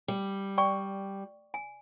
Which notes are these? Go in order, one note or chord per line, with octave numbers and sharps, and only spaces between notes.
G3
D5 G5 C#6
G#5